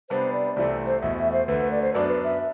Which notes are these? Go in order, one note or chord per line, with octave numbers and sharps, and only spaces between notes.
C3 G3 B3 D4 C5
D5
C2 C3 E3 A3 C4 D5
C5
E2 B2 A3 E4 E5
E5
C5
D2 D3 A3 B4
D5
C5
F#2 F#3 B3 D4 D5
B4
E5